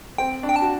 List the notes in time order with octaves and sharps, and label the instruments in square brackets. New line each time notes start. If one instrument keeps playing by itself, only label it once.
[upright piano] C4 [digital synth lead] G5
[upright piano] D4
[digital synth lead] G5
A5
[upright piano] F#4